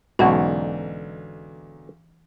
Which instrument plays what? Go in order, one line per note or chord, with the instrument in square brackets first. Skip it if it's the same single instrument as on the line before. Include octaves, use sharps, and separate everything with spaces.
[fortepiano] B1 G#2 [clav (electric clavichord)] B2 D3 [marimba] E3 C#4 D#4 [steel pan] F#4